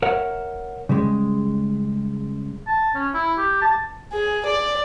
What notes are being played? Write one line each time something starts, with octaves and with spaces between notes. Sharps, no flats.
A#4 C#5 E5 F#5
C#3 G3 G#3
A5
C#4
E4
G4
A5
G#4
D5